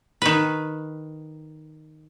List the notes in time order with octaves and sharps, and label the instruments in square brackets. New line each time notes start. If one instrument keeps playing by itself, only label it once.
[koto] D#3 B4